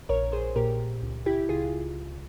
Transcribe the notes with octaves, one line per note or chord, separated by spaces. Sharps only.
A#1 A#4 C#5
G#4 C5
A#2 G4 A#4
C#2
E4 G4
C#2 F4 G#4